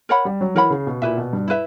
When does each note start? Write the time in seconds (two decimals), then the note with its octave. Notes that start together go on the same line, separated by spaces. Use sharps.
0.09 A#4 C#5 F#5 B5
0.25 G3
0.41 F#3
0.55 E3 A#4 C#5 F#5 B5
0.70 C#3
0.87 B2
1.02 A#2 E4 B4 E5
1.18 B2
1.33 G2
1.48 E4 B4 E5